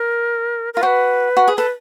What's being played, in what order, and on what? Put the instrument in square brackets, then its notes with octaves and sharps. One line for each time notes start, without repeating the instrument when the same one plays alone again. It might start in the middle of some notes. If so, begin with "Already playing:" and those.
Already playing: [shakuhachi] A#4
[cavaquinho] F4 [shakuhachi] A#4
[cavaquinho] F#4 [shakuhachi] B4 C5
[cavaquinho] F#4
G#4
[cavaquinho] A4 [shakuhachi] B4